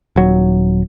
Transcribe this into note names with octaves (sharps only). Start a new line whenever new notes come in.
D#1 F#3